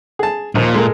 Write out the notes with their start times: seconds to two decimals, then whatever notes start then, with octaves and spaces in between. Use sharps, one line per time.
0.19 G#4 A5
0.55 D#2 A#2 F3
0.74 G#3 A4 A#4